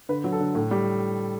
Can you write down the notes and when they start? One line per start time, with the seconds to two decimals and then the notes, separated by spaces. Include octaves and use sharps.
0.09 D3 B4
0.24 F#3
0.32 A4
0.40 D3
0.55 A2
0.71 G3